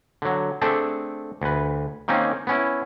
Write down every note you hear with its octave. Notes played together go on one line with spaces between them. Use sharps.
D3 F#3
A3 C4 D4 G#4 A4
D2 B4
D#3 A#3 C4 C#4 D#4
B3 C#4 E4